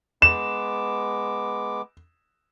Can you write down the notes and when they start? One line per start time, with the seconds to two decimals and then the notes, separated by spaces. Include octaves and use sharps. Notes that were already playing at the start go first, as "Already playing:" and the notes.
0.22 G#3 B3 D6 E7